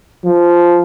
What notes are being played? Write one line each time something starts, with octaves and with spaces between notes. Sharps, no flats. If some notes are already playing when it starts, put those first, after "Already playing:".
F3